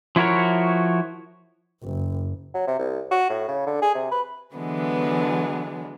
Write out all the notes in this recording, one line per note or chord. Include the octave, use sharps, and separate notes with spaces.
F3 E4 F#4 A#4 C#5
F#1
F#3
C3
C2
F#4
A2
C#3
D3
G#4
C3
B4
D3 E3 F#3 G#3 B3